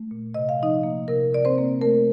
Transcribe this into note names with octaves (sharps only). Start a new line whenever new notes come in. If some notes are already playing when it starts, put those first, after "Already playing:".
Already playing: A3
A#2
C3 D#5
F5
F3 D#4 D#5
A#3
C3 A#4
C3 D5
C4 C5
A#3
A3 A#4